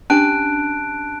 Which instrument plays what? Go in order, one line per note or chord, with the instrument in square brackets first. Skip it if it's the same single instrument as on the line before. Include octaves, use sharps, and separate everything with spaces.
[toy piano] C#4 D4 G4 [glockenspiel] A5 F#6 D7